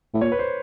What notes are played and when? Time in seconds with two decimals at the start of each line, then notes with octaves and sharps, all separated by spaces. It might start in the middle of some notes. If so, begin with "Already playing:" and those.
0.14 A2
0.21 A#2 C#5
0.32 B4
0.39 C5